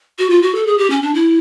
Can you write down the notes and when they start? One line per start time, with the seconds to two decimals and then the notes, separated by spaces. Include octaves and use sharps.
0.19 F#4
0.30 F4
0.42 F#4
0.55 A4
0.67 G#4
0.78 G4
0.90 C#4
1.02 D4
1.14 E4